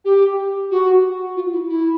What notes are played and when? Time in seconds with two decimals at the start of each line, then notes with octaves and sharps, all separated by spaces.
0.05 G4
0.71 F#4
1.36 F4
1.52 E4
1.69 E4